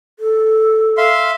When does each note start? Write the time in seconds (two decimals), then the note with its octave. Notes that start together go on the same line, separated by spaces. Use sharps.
0.19 A4
0.97 E5 F5 C6